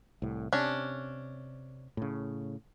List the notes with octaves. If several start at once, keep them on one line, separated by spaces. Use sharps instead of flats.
C2 A2
C3 C#4 D4
A2 C#3